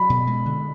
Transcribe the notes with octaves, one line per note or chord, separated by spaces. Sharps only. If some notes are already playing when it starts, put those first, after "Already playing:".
Already playing: F#3 B5
B2
G#3
D3